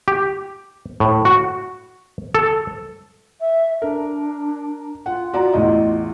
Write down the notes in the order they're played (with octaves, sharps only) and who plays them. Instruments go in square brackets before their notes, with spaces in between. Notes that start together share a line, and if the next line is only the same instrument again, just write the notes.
[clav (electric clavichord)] G4
A2
F#4
A4
[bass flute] E5
[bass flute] D4 [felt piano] A#4
[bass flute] F4 [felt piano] F#5
[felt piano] F#4 D5 A#5
A1 E2 D#5